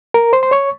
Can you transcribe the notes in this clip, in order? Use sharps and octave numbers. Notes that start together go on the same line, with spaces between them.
A#4 A#5
C5 C6
C6
C#5 C#6